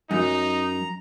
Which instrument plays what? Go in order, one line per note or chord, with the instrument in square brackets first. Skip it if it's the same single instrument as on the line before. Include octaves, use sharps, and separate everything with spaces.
[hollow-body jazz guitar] F#2 [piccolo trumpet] D#4 [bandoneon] A#5